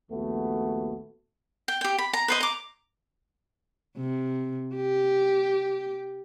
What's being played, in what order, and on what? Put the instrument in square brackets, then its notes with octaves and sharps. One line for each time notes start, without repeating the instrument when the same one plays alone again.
[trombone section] A#1 D#2 A3 B3 F#4
[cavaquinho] G5
G4 G5
B5
A#5
B4 C5 D#5
A#5 D6
[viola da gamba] C3
G4